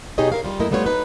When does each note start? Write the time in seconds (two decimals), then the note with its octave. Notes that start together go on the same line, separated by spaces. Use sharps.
0.18 B2 D#4 G4 G#4 C#5 D#5
0.32 A#4 F5
0.44 G3 F4
0.60 F#2 A3 A#3 E4 A#4 D#5
0.71 G3 A3 B3 F4 B4 C#5
0.86 D#4 B4